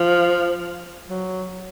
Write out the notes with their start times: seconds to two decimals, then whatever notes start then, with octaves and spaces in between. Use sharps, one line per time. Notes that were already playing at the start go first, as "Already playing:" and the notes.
Already playing: F3
1.10 F#3